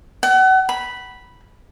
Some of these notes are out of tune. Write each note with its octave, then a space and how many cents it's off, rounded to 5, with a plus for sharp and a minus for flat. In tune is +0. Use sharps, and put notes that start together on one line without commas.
F#5 +35
B5 -5